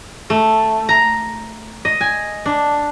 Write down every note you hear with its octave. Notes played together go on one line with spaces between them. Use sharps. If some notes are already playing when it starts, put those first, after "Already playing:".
A3
A#5
D#5
G#5
D4